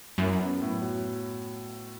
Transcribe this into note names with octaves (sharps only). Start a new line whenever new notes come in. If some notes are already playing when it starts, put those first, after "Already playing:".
F#2 E4
B3
A2
F#3